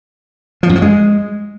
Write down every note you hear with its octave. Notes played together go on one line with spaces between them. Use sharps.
F3
F#2
F3
G#3